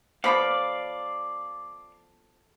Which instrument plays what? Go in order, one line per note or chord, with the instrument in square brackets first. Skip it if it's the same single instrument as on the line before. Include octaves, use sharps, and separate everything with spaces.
[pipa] F3 B3 C#6 [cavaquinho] A4 B5 D6 [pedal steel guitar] D5 F5